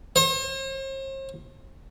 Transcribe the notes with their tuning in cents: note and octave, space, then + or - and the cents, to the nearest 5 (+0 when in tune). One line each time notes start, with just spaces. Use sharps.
C5 +45